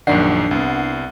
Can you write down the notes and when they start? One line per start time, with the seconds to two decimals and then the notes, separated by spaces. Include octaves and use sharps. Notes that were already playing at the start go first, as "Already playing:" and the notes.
0.07 A#1 F#2 D#3 D4 F#5 C7
0.51 C2 B3